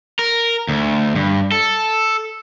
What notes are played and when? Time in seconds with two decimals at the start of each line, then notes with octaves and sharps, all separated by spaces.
0.19 A#4
0.68 D2
1.15 G2
1.52 A4